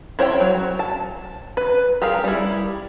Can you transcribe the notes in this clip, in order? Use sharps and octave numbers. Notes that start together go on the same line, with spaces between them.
E4 C5 C#5 G5
F#3
A5
B4
G4 G#4 A#4 F5
G3 E4